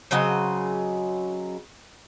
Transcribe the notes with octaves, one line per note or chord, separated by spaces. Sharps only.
C#3 F#3 C4 D#5